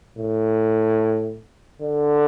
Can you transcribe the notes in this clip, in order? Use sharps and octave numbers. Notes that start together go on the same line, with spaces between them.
A2
D3